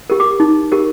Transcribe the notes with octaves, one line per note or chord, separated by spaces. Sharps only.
G4 A#4
D6
D#4
G4 A#4